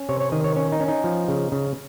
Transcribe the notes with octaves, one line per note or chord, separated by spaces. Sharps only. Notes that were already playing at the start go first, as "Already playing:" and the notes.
Already playing: C#4
C3 C#5
C#5
D#3 D#5
C#5
C#4 C#5
D#4
C#4
D#4
F3
C#3
C#3